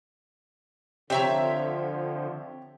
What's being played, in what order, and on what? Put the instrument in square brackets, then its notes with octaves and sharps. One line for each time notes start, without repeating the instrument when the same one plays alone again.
[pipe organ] D3 F3 [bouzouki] C4 E5 A#5 [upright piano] G4 C#5